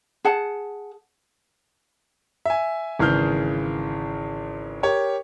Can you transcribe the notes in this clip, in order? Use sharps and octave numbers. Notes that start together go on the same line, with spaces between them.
G#4 F#5 A5
E5 G#5
G#1 C#3 E3 G#4 F6 G6
G4 A#4 C#5